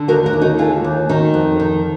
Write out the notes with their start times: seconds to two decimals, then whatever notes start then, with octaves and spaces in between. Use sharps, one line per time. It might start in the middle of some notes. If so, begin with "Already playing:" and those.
Already playing: D3
0.08 D#2 F#4 A#4
0.26 F#4 A#4
0.33 D#2
0.41 D#4 F#4
0.58 D3 F4 G#4
0.84 D#2
1.09 D#3 D#4 F#4
1.34 F2
1.60 D#3